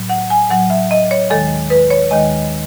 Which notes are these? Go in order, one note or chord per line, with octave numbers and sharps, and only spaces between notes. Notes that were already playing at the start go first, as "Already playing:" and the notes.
Already playing: A2 F#3
F#5
G#5
A2 F#3 F#5
E5
D#5
C#5
D#2 D#3 G#3 A4
B4
C#5
D#2 D#3 G#3 D#5